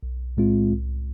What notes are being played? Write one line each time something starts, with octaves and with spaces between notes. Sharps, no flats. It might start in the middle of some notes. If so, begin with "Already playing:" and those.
B1
A2 G#3 C4 F4
C2